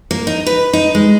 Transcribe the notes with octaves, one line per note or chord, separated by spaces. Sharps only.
A#3
D#4
B4
D#4
G#3